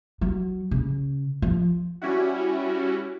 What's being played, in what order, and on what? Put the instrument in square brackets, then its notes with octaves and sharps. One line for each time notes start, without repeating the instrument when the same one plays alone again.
[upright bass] F#3
C#3
F3
[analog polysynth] G3 C#4 E4 F#4